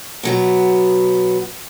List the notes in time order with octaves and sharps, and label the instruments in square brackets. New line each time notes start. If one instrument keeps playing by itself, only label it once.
[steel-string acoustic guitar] B2 F#3 B3